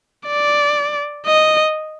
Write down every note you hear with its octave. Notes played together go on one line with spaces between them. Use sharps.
D5
D#5